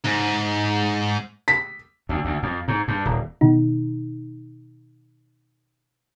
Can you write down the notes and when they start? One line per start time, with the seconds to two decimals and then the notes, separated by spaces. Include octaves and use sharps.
0.04 G#2
1.48 B6
2.09 D2
2.25 D2
2.43 F2
2.68 G#2
2.88 G2
3.05 D#1
3.41 B2 D#3 D#4